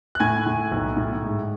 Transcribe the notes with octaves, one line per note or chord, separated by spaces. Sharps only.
F#6
A2 G#5 G#6
A2
B1
A2
G#2